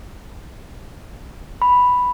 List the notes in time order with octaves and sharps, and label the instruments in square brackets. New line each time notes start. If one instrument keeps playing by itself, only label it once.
[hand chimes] B5